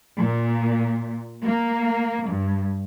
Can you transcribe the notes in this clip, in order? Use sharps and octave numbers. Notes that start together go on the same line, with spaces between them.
A#2
A#3
G2